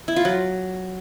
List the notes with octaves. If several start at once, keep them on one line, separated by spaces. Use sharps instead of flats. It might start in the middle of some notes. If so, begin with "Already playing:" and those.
E4
F4
F#3